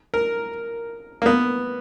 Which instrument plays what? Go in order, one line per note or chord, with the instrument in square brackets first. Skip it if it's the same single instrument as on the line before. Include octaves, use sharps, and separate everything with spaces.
[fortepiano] A#4
A#3
B3